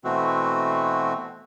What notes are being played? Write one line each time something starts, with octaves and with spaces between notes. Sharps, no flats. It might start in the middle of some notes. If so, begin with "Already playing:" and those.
B2 E3 A3 C4 F#4